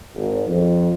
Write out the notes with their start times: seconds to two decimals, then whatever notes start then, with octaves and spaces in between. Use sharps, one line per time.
0.15 G#1
0.47 F2